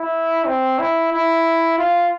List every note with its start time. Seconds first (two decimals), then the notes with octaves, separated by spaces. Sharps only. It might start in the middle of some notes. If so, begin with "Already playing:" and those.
Already playing: E4
0.46 C4
0.79 E4
1.12 E4
1.78 F4